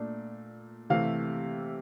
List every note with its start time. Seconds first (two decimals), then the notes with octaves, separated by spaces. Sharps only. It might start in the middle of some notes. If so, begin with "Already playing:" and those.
Already playing: A#2 A3 D4
0.90 C3 E3 A3 F5